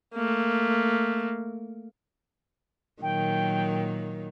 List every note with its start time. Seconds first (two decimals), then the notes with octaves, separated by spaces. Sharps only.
0.14 A3 A#3
3.02 A#2 D#3 F#3 G5